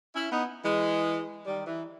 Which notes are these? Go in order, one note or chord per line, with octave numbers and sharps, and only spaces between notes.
C#4 E4
B3 D#4
E3 G#3
D#3 G3
E3